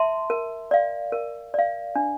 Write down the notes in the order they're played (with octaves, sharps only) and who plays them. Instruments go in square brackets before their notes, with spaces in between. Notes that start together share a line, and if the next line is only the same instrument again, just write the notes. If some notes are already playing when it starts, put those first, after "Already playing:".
Already playing: [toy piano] E5 A5 C6
A#4
D5 F5
A#4
D5 F5
D4